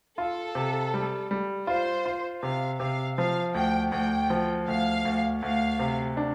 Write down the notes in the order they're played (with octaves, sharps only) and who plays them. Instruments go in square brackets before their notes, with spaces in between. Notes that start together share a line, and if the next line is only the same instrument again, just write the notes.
[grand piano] F4 [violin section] A4
[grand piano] C3
G3
G3
[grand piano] F4 [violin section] C5
[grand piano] F4
[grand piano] C3 [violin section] F5
[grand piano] C3 [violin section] F5
[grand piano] F3 [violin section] F5
[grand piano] D2 [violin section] G5
[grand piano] D2 [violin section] G5
[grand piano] F3
[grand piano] D2 [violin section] F5
[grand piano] D2
[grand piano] D2 [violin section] F5
[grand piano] C3
D4